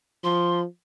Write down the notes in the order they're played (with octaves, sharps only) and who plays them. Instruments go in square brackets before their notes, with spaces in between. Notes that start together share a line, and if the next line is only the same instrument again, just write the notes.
[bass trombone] F3 [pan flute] C6